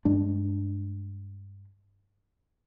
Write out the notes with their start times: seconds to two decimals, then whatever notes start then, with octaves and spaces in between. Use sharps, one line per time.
0.05 G2 G#3 D4